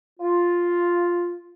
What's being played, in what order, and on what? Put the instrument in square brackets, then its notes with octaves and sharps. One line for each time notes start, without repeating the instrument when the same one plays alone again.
[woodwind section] F4